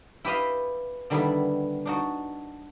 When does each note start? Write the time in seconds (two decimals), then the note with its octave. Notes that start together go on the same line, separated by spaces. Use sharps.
0.25 E4 G4 B4 D#5 F5
1.10 D3 D#3 G3 B3 D4 E4
1.86 D4 D#4 F#4